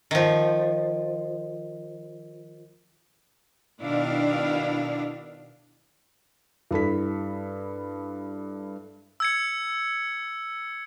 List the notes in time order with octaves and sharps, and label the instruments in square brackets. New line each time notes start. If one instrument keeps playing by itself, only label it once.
[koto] D#3 F3
[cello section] B2 D#3 D4 E4 F5
[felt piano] G2 E4 A4 B6
[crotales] E6 G#6 C#7